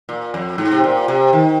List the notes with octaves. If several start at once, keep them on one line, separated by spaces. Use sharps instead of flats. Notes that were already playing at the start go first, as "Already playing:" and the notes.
A#2
F2
G#2
C3
A#2
C3
D#3